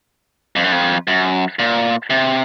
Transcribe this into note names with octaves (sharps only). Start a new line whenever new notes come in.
F2
F#2
F2
F#2
A#2
C3